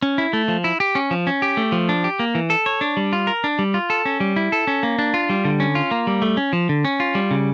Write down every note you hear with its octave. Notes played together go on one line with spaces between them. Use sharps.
C#4
E4
A3
F3
E4
G4
C#4
F3
C#4
G4
A3
F3
D4
G4
A#3
E3
A4
C#5
D4
G3
F4
A#4
D4
G3
F4
A4
C#4
G3
E4
A4
C#4
A#3
D4
F4
G3
D3
C#4
F4
A#3
G3
A3
C#4
F3
D3
C#4
F4
G3
C#3